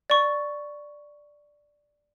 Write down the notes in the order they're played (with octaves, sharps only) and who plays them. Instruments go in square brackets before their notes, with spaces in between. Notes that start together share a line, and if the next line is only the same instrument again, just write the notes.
[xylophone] D5 C#6